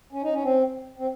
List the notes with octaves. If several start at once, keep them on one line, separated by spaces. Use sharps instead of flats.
C#4
D#4
C#4
C4
C4